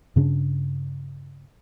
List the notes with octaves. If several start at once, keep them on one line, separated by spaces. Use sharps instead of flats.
G2 C#3 D4